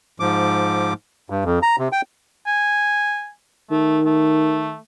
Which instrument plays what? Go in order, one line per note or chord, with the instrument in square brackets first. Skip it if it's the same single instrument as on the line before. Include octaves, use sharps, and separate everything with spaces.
[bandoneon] G#2 F3 D6
G2
F2
A#5
C3
G5
[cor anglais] G#5
[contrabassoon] D#3 [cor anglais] A3
[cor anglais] A3